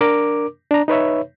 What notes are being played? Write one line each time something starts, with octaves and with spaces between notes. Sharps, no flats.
D4 A#4 D6
D4 A#5
D#4 B4 C#5 E5